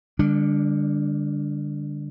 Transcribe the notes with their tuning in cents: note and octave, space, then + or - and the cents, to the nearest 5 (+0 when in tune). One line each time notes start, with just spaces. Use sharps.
D3 +0 G3 +35 D4 -10